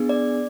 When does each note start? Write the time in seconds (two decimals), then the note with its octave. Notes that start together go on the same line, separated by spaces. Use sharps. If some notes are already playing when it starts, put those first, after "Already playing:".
Already playing: B3 D4 G#4
0.09 D5